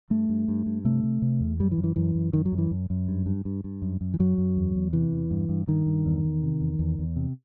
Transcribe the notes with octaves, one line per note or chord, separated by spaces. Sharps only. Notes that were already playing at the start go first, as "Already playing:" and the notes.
G2 A3
G2
G2
G2
C3 A3
C3
C3
E2
F#2 G3
E3
F#2
E3
F#2 E3
F#2
F#2 D#3
F#3
F#2
E3
F#2
F#2
G2
G2
G2
G2
F#2
F#2
E3
F#2 F#3
F#2
E2
E2
C3 E3
E2
G2
G2
G2 D#3
G2
E2
E2
C3
E2
E2
E2
C3